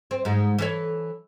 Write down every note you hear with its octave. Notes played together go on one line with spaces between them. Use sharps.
C4
G#2 G#3
E3 A4 C#5